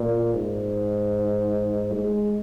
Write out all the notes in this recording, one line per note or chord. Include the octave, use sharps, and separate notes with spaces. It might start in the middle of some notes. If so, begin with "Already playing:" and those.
Already playing: A#2
G#2
G#3